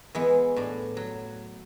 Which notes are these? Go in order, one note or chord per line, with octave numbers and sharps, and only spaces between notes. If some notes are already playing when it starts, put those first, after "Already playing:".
E3 G#3 B3
A2 D4
F#3